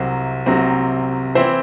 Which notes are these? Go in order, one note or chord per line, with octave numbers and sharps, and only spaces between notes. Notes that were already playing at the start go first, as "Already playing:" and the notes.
Already playing: C2 C3 F#3 C4
C2 C3 F#3 C4
E3 C4 E4 C5